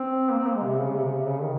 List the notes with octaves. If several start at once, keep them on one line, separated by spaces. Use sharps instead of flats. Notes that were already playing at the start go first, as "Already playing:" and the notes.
Already playing: C4
A#3
C4
A#3
G#3
C3
C#3
C3
C#3
C3
C#3
D#3